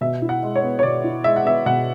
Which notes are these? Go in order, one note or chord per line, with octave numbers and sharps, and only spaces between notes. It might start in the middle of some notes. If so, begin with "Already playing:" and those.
B2 E5
E4
F#5
G#3
C#5
B3
C#5
B2 D5
E4
G#3 E5
F#5
B3 E5
B2 F#5